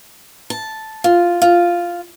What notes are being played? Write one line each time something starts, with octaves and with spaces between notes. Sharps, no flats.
A5
F4
F4